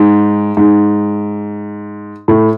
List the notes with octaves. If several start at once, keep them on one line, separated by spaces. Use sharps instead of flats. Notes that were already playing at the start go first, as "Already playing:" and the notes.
Already playing: G#2
G#2
A2